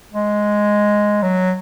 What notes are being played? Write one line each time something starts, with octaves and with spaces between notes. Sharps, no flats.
G#3
F#3